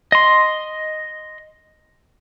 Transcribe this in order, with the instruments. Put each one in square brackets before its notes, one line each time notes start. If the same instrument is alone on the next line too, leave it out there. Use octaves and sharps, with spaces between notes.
[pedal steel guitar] D#5 C6